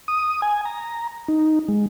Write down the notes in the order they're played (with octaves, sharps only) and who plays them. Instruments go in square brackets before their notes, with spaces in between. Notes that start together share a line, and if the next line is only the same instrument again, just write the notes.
[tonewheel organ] D#6
G#5
A#5
D#4
G#3